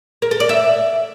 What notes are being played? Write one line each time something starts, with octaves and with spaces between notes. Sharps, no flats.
A#4
A4
D5
E5